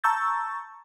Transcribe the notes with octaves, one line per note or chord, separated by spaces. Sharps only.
A5 A#5 C#6 E6 G6 A6